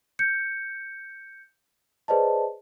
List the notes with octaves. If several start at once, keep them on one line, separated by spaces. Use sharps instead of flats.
G6 C#7
G#4 B4 C5 D5 D#5 A5